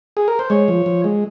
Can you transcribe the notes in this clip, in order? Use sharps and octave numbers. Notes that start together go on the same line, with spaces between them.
G#4
A#4
C5
G#3 C#5
F3
F3
G#3